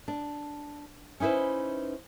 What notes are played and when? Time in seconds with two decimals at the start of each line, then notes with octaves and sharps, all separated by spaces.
0.08 D4
1.20 C#4 D#4 E4 B4 C5